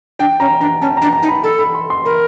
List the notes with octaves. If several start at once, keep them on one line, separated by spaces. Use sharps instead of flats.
D4 G5
C#4 A#5
D4 A#5
C#4 A5
D4 A#5
A#5
D#4
B5
A4 B5
B5
C6
C6
A#4 B5